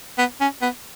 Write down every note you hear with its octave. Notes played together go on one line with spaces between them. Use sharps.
B3
C#4
B3